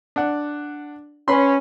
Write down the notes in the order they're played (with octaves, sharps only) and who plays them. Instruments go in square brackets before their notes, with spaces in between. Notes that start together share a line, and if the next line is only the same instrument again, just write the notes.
[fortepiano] D4 F#5
[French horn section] C#4 [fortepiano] B4 B5 C6